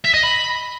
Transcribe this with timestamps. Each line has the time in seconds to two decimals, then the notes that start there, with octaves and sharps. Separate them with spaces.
0.05 E5
0.14 D#5
0.23 B5